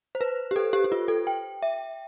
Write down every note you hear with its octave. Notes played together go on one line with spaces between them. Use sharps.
C5
B4
G4
A4
G4
G4
F4
A4
G5
E5